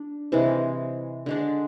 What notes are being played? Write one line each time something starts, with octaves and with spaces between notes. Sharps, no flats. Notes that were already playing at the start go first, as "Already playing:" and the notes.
Already playing: D4
C3 E3 G#3
D3 G#3 D4